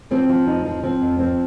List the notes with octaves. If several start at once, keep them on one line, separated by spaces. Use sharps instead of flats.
F3 C4
F3
F2 D#4
F3
F3 C4
F2
F3 C4